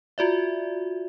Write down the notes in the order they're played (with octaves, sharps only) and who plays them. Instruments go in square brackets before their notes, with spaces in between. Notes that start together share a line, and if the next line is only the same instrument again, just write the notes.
[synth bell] F4 F#4 D5 E5